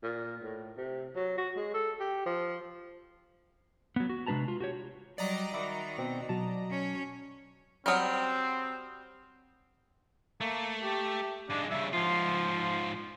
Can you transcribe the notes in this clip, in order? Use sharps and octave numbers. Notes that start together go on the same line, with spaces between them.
A#2
A2
C3
F#3
F#4
G#3
A4
G4
F3
F#3 B3
F#4
C3 G#3 D4 B4 A5 A#5
F4
F#4 G4 C#5
F#3 G3 D5 D#5 A#5
D#3 F#4 E5 B5 D6
B2 C4
B2 F#3 F#4 A5
C#4 C#5
F#3 G3 C4 F#5 D#6 F6
A3 A#3
G4
G2 G#3 D4
G2 C#3 E5
G#2 F3 F4